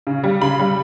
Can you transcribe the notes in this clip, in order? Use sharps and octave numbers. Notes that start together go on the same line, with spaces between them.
C#3
G3
C#3 B5
G3